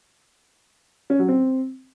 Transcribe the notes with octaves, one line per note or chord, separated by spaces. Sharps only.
C#4
F#3
C4